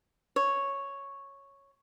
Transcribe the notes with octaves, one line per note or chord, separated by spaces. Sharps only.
C#5